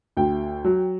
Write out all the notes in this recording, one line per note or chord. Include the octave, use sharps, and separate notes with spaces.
D2 G5
F#3